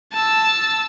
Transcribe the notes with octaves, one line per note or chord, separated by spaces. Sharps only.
A5 E6